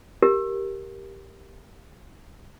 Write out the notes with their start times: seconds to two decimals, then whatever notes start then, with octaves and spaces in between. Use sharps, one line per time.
0.22 G4 A#4